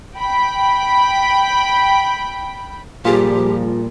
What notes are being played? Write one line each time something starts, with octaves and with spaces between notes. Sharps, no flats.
G5 B5
A#2 F3 G3 F4 G4 G#4